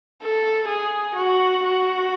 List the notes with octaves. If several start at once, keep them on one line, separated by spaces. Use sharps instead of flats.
A4
G#4
F#4
F#4